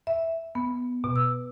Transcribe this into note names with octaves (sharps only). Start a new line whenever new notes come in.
E5
B3
B2
E6